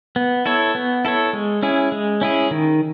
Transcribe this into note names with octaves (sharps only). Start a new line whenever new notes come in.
B3
E4 A4 C#5
B3
E4 A4 C#5
G#3
C#4 E4 G#4
G#3
C#4 E4 G#4
D#3